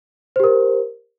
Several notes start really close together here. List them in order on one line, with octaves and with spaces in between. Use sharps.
C5 G4 A#4